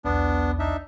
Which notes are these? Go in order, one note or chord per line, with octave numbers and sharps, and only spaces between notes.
B1 E2 B3 D4
D4 D#4 E5